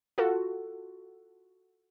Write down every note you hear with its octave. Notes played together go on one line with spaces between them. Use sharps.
F4 F#4 A4